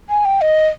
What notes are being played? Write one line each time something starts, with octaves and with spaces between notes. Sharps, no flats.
G#5
G5
D#5